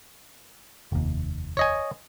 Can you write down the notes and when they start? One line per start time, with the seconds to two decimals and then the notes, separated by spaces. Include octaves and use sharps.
0.92 F1 D#2
1.57 C#5 D#5 G#5